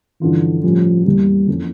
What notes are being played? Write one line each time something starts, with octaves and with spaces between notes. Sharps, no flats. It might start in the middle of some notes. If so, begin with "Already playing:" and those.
G2 D3 E3 F3 C#4 F4
A2 F3 G3 C#4
E2 E3 G3 A#3
F2 E3 A#3 C#4